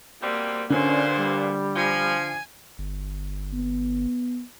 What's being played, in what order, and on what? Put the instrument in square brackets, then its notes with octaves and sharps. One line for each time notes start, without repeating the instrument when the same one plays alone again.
[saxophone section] B2 G3 C4 [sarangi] A#3
[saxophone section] G2 A#2 [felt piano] D3 [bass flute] C#4 [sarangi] C5
[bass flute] G3
[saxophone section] F3 [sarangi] G#5
[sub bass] G1
[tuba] B3